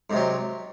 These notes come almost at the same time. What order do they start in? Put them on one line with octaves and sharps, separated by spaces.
G#2 C3 F#3